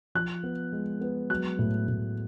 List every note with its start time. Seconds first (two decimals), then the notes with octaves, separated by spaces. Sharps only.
0.15 F3 F#6
0.43 B3
0.73 G#3
1.01 B3
1.30 F#3 F#6
1.59 A2
1.88 A2